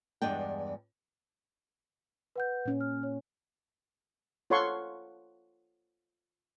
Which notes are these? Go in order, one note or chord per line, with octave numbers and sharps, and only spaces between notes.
E2 G2 G#3 D4 G5
B4 F#5 G6
A#2 C#4
F6
C#5
F4 A4 C#5 F#5 C6 C#6